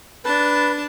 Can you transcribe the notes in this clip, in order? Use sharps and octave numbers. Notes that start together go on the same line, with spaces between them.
D4 B4 A5